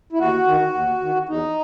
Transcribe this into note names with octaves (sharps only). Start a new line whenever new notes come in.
E4
D#2 F#4
D#3
D#2
D#3
E2 D#4